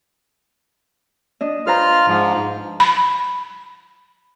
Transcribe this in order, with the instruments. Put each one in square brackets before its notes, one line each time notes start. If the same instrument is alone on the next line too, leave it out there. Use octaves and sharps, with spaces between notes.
[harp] D4 D#5
[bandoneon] F4 F6 [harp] B4 C5 A#5
[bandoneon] G#2 F3
[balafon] B5